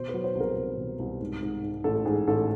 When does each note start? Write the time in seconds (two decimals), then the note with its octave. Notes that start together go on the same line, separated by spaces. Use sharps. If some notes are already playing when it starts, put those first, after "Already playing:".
Already playing: B2 C5
0.09 B4
0.14 F#3
0.24 C5
0.35 C2
0.40 A#4
0.56 C2
0.78 B2
0.99 C2
1.20 G#2
1.42 G#2
1.63 G#2
1.84 A1 A4
2.05 G#2 G#4
2.28 A1 A4